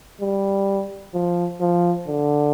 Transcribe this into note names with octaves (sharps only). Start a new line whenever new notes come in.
G3
F3
F3
D3